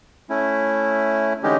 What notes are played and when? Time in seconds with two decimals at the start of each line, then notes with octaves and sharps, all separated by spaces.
0.30 A3 C#4 E4
1.43 D3 E3 G#3 C#4 D#4 G4